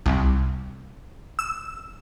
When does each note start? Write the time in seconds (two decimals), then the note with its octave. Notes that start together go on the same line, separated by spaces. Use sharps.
0.06 C2
1.39 E6